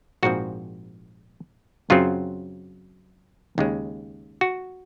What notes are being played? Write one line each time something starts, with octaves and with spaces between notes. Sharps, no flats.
A#1 G#2 F3 C4 F#4
F#2 C#3 F#3 C4 F4
D#2 C#3 G#3
F#4